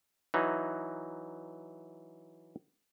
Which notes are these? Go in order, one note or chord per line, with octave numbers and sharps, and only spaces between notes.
E3 F#3 D#4